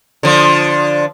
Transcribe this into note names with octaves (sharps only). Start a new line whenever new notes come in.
D3 F3